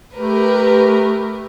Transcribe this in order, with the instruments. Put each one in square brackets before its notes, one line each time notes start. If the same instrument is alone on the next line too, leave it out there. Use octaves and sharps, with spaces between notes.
[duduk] A3 [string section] G4 A#4 B4